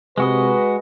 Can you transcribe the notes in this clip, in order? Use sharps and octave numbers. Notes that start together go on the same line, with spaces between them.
C3 G#3 F#4 B4 D#5